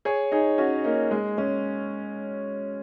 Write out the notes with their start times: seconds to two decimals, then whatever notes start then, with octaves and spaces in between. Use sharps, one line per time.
0.05 G#4 C#5
0.32 D#4 G#4
0.58 C#4 F#4
0.84 A#3 D#4
1.11 G#3
1.38 G#3 C#4